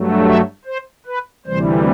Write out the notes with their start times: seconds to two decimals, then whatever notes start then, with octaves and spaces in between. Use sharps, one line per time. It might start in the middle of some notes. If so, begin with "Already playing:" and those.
Already playing: G2 F#3 A3
0.25 E5
0.65 C5
1.06 B4
1.46 D2 C3 E3 G3 C5